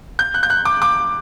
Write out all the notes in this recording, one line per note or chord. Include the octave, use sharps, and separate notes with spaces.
G6
F#6
G6
F#6
D6
D6